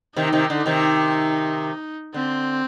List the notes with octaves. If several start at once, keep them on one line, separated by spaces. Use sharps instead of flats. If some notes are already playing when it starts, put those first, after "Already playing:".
C3 D#3 D#4
C3 D#3
D3
C3 D#3
D3 C4